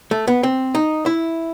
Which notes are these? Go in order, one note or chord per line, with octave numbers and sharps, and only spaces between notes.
A3
B3
C4
D#4
E4